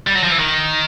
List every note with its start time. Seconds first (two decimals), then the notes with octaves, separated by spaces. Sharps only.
0.07 G3
0.15 F#3
0.23 F3
0.31 E3
0.39 D#3